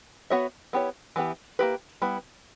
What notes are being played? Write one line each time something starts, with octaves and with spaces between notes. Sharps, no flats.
B3 F#4 C#5 E5
B3 E4 G4 C#5
E3 B3 E4 G4
A#3 E4 G4 B4
G3 B3 E4 B4